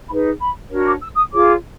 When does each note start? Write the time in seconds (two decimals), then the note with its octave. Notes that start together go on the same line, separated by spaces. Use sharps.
0.08 D#4 G#4 B4 B5
0.40 B5
0.70 D4 F#4 A#4 C#5
0.86 D6
1.01 E6
1.15 D#6
1.31 F4 G#4 C#5 D6